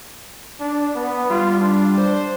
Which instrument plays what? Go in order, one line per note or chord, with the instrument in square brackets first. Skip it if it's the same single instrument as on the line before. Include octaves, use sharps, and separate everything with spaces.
[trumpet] D4
B3
[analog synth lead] G3 [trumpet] F4
[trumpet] D4
[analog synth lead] C5